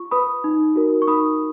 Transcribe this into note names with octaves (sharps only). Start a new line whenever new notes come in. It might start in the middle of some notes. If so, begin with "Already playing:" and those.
Already playing: F4 C#6
B4 B5 D#6
D#4
F#4 A#4
C#6
D#4 B5 D#6